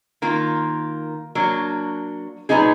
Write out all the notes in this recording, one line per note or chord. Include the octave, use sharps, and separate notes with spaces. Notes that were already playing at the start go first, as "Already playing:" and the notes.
D#3 A#3 F4
F#3 A#3 D4
A#2 F#3 B3 D#4 G#4